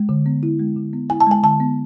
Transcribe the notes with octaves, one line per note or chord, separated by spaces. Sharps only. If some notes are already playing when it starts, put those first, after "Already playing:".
Already playing: G#3
D3
B3
E4
G#3
D3
B3
E4 G#5
A5
G#3 G#5
D3 A5
B3